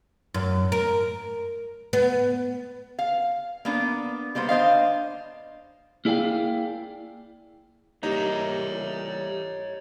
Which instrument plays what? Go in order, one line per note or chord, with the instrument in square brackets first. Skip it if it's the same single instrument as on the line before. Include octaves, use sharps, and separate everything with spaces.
[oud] F#2
A#4
B3
[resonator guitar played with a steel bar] F5
A#3 B3 D4
G3 A#3 B3 C5
D4 C5 D#5 F5
[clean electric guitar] A#3 E4 G#4 D5 F5 G5
[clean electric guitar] E3 G3 A#3 [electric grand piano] D#4 [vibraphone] G4 [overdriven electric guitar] C#5 E5